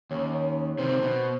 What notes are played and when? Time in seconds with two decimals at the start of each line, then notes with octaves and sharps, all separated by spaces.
0.11 D#2 C#4
0.34 C#4
0.79 C3 D#3 C5
1.02 B2